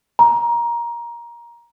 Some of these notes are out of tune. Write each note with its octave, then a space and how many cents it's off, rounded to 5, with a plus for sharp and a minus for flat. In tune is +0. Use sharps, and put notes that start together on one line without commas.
A#5 +15